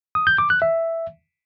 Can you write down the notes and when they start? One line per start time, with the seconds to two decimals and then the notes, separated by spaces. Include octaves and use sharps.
0.15 D#6
0.27 G6
0.38 D6
0.50 F#6
0.62 E5